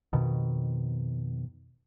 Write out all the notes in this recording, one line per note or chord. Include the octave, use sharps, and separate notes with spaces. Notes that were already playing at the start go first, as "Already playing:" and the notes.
F2 B2 D#3